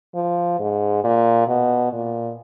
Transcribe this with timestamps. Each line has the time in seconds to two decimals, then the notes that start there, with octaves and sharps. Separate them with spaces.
0.15 F3
0.60 G#2
1.04 A#2
1.48 B2
1.93 A#2